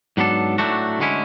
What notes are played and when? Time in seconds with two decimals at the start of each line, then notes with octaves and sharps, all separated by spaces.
0.17 G#2 F#3 B3 D4 A4
0.58 A2 F#3 A3 D4 F#4
0.99 D2 D3 G#3 C#4 E4